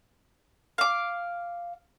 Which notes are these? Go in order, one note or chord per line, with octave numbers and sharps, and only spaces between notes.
F5 D6